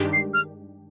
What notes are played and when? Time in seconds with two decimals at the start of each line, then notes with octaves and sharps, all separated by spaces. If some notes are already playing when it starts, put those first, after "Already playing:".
Already playing: G2 D#3 G#3 D4 G4
0.13 C7
0.34 F6